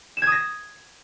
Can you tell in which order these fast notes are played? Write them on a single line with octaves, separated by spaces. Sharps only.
E7 G#6 D#6 A#6